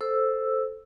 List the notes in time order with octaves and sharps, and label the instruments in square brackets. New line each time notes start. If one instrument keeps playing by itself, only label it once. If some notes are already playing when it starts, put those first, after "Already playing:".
[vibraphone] A4 C5 E6